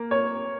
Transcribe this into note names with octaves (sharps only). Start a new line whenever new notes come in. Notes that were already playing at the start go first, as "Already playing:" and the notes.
Already playing: A#3
C#5